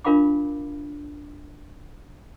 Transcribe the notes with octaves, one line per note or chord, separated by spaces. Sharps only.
D4 F4 A#4 F5 B5 D6